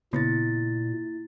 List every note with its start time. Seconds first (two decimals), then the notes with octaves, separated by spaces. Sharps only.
0.13 A#2 C#3 A#3 B3 E4 A6